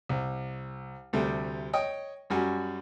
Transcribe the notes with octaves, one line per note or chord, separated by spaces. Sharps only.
C2
D2 C3 G3 A3
C#5 D#5 G5 D#6
F#2 G3 F#4 G#5